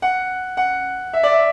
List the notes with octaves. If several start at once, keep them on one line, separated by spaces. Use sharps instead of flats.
F#5
F#5
E5
D5
E5